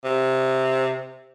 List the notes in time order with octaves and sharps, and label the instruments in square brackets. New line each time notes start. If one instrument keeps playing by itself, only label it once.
[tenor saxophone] C3